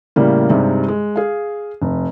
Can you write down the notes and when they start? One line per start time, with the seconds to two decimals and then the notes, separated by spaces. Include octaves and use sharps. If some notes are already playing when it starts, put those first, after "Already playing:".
0.16 A2 C#3 G3 A#3
0.50 G2 C3 G3 G#3 D#4
0.88 G#3
1.16 G#4 F5
1.82 F1